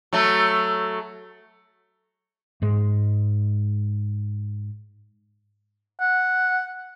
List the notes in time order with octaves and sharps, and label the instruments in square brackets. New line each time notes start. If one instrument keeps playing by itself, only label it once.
[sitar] F#3 A3
[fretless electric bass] G#2 G#3
[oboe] F#5